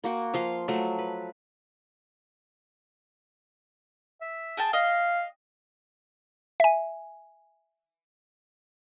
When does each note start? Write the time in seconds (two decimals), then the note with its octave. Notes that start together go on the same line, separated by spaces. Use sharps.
0.04 A#3 F#4 G5
0.34 F3 F5 C6
0.68 F3 F#3 A3
0.98 B4
4.22 E5
4.57 G#4 G5 A5
4.73 D#5 F5
6.60 E5 G#5